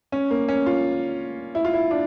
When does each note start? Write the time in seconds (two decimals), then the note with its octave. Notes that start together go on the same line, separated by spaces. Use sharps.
0.12 C#4
0.31 A#3
0.48 C#4
0.66 F4
1.55 E4
1.65 F4
1.73 E4
1.91 D4